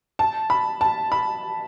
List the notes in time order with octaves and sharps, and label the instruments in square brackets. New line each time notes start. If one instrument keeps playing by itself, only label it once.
[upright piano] A5
B5
A5
B5